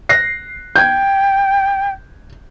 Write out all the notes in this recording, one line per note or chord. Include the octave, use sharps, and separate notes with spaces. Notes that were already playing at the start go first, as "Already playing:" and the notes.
F#6 A#6 C7
G5 G6 G#6